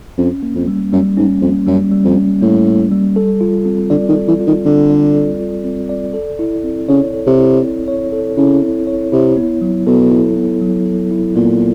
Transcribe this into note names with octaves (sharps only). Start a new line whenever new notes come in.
F2 C#4
A#3
F2
G3
F#2 G3
G#2 C#4
F2 A#3
F#2 G3
G3
F2
C#4
A2 A#3
G3
G3
A4
F4
C4
D3 D5
D#3
A4
E3
F4
D#3
D3 C4
D5
A4
F4
C4
D5
A4
E4
C4
C#3 C#5
A4
C3
E4
C4
C#5
A4
C#3 E4
C4
C#5
C3 E4
B3
F#3
B2 A4
E4
B3
F#3
A4
E4
A#2 B3